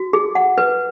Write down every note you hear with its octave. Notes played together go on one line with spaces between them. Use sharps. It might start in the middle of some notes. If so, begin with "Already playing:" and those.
Already playing: F#4
G#4
F#5
B4